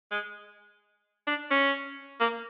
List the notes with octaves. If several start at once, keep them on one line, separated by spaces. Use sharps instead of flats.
G#3
D4
C#4
A#3